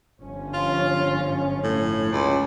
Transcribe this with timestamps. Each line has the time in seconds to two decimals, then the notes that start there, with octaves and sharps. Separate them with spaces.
0.20 G1 F3 C#4
0.54 F4
1.64 A2
2.12 C#2